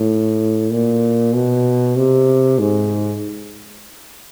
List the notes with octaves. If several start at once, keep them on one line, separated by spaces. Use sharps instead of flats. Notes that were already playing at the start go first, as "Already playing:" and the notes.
Already playing: A2
A#2
B2
C3
G#2